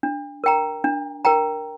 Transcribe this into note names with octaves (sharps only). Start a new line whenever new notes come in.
D4
A#4 G5 A#5
D4
A#4 G5 A#5